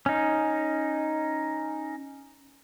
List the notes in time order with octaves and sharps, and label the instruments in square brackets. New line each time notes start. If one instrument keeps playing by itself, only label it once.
[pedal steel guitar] C#4 D#4